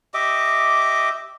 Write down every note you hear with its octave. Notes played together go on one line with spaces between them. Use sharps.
G4 D#5 E5 D6